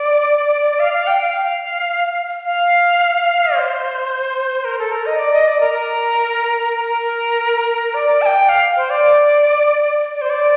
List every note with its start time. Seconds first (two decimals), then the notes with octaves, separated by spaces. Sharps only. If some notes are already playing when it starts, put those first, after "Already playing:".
Already playing: D5
0.79 F5
0.93 F5
1.07 G5
1.22 F5
1.34 F5
2.45 F5
3.55 C5
4.64 A#4
4.79 A4
4.91 A#4
5.06 D#5
5.19 D5
5.33 D#5
5.47 D5
5.60 A#4
5.74 A#4
6.84 A#4
7.94 D5
8.22 A5
8.26 G5
8.49 F5
8.77 C5
8.90 D5
10.14 D5
10.21 C5
10.30 D5